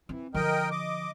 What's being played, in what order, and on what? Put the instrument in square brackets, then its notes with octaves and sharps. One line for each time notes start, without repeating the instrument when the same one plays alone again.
[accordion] E3 [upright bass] C4
[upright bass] D3 F3 [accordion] A#4 D#5 G5
[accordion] D#5 D6